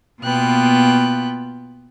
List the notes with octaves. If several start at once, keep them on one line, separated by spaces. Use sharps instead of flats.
B2 A#3 B3 F4 G5 F#6